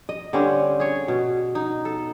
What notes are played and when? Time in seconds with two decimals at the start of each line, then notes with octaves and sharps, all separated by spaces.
0.09 D#5
0.33 D3 G3 C4 C#4
0.80 G#4 C#5
1.08 B2
1.55 D#4
1.85 A4